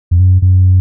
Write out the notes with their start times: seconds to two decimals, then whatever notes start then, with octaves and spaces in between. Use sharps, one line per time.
0.11 F2
0.20 F#2
0.42 F#2